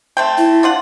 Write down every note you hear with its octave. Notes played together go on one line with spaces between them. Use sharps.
A3 C4 G5
E4
D4 F4 F#5